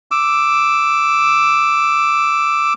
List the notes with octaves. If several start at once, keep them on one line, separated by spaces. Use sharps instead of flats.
D6 E6